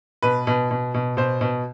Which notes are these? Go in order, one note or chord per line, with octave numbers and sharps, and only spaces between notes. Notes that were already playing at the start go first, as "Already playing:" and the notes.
B2 B4
B2
B2
B2
B2 C5
B2